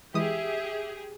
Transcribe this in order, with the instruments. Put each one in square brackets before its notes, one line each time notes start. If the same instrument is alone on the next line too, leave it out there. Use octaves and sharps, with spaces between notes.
[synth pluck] E3 G#3 D#6 [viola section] G4 G#4 [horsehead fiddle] E5